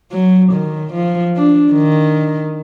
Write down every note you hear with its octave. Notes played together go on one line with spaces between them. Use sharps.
F#3
D#3
F3
D4
D#3